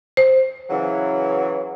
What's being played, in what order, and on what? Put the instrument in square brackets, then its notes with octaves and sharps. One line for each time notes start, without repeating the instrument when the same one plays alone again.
[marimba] C5
[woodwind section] C#3 E3 F#3